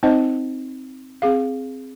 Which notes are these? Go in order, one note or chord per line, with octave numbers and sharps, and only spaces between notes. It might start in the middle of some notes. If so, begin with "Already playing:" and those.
C4 D#4 C5 D#5
C4 G#4 F5